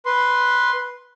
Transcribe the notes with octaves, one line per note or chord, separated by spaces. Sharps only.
B4 C6